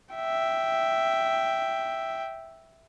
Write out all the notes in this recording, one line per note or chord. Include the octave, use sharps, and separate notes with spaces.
E5 G5